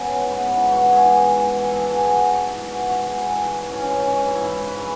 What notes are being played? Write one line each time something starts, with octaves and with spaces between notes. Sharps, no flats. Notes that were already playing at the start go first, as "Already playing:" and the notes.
Already playing: G#2 B3 C#4 E4
E3
G#2 B3
E3
G#2 F#4
E3 G#4
G#2
E3
G#2
A4
E3
G#4
G#2 F#4
E3
G#2
E3
G#2 F#4
E3 F#4
G#2 G#4
B4
E3 A4
G#2
E3 C#4
G#2 C#4
E3
G#2 E4
E3
G#2 B4